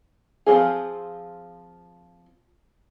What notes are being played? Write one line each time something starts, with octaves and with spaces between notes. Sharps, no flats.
F3 C4 D4 F4 G#4